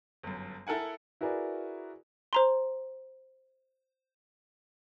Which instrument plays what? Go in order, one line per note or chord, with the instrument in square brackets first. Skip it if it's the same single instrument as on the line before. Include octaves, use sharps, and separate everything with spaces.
[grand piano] G1 F#2
E4 A4 A#4 F#5 G#5
[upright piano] E4 F#4 G#4 A#4 B4 D5
[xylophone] C5 A#5 C6